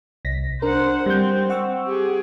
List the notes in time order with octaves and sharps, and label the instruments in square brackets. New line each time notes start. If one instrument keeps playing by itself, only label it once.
[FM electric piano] C2 A#6 B6
[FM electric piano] D4 A#4 [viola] C5 F#5
[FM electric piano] G3 G6 [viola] C4
[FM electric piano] F#5 C#6 E6
[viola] G4 G#4